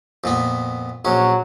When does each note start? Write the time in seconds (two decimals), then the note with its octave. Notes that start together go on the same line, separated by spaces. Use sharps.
0.24 F2 A#2 B3
1.05 A#1 F#3 C#4